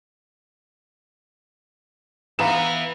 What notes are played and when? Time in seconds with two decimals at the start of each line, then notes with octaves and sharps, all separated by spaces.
2.39 E3 B3 F5 A#5 E7